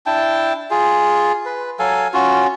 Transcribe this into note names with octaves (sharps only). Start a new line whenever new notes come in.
D4 E4 G5 A5
F4 G#4
B4
F#3 A4 F5 G#5
C#4 F4 F#4